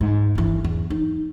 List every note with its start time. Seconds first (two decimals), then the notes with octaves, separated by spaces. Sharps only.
0.01 G#2
0.35 G1 E3
0.64 E2
0.90 D#4